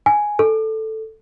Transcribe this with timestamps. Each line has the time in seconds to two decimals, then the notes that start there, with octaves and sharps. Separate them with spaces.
0.06 G#5
0.39 A4